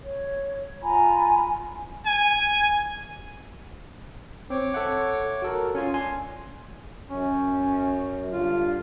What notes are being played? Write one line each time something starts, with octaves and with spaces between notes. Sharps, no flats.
C#5
F4 G#5 A#5 B5
G#5
C4 C#5 D6
A4 E5 F#5
F#4 A4 A#4
C#4 F4 C#5 G#5
D4 G#5 C6
F#2 C#4
G2 D3 F4